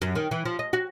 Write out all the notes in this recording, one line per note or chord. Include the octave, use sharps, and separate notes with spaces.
F#2
D#3
E3
F3
D#5
F#4